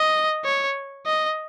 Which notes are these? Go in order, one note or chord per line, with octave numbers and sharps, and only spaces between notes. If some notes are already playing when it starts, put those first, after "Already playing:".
Already playing: D#5
C#5
D#5